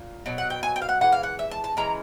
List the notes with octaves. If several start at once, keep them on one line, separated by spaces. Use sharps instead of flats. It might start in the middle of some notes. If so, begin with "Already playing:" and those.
Already playing: A#2
B2 F#3
F#5
G5
G#5
G5
F5
F#5
E3 G#3 F#5
F5
F#5
E5
A5
A5
E3 G#3 C#4 A#5